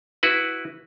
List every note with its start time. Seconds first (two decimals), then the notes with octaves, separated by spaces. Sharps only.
0.23 E4 F#4 B4